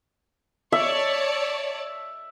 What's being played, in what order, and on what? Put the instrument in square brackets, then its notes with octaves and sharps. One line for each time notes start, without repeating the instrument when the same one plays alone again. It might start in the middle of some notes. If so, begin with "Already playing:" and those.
[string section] C#5 D5 A5 [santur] E5